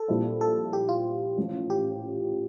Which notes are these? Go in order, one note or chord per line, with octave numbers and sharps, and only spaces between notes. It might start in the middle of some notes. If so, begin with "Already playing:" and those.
Already playing: A4
A#1 A#2 G3 C4 E4
A4
G4
F4
A1 A2 F3
G4